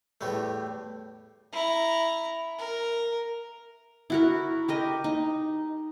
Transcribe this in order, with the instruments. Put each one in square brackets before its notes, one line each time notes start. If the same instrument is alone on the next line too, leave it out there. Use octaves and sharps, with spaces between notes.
[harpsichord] E2 A2 G3 A3
[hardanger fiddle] E4 A#5
A#4
[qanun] E4 F#4 A#4
G4 A#4 D#5
D#4